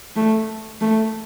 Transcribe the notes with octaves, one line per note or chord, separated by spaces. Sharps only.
A3
A3